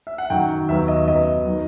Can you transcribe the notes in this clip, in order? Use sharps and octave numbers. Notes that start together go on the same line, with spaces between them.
E5
F#5
F#2 D#3 F#3 G5
D#2 D#3 F#3 B3 E5
D#5
F#2 F#3 B3 D#5
D#3 F#3